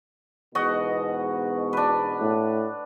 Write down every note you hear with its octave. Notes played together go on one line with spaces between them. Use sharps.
E2 G#2 B2 F#4 D#5
D4 B4
A2